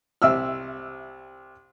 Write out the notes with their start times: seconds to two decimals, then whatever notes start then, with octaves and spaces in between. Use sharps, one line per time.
0.22 C2 E5 E6 F6